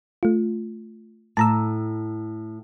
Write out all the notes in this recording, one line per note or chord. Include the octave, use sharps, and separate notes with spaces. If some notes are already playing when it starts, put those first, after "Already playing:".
A3 F4
A2 A5 A#5 E6